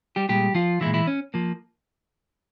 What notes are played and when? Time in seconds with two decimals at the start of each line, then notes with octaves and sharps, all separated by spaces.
0.16 G3 G4
0.29 A#2 G3 G#3 G4
0.55 F3 F4
0.81 E3 G#3 E4
0.86 A#2
0.94 E3 E4
1.07 C#4
1.34 F3 A#3